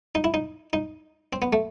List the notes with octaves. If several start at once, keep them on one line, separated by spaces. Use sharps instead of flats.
D#4
E4
D#4
D#4
C4
B3
A3